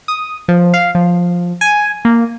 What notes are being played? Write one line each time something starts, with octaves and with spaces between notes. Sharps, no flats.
D#6
F3
F5
F3
G#5
A#3